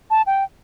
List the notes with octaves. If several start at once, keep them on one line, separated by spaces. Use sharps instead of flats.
A5
G5